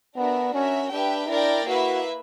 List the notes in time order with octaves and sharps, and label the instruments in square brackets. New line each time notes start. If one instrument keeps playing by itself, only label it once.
[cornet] B3 [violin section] D4 F#4 A#4 E5
[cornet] C#4 [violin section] F#4 A#4 E5
[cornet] D4 [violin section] G4 B4 E5 G5
[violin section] D4 A#4 D5 G5 [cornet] E4
[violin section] A#3 E4 B4 E5 [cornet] F#4